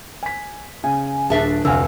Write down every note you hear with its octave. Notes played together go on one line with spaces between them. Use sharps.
G#5 B6
C#3 G#5
D#1 D4 G#4 E5 A5
F1 D2 F#3 F5 G#5 E6